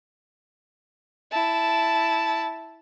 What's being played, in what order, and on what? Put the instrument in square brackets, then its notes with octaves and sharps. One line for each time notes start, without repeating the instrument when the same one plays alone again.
[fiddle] E4 A5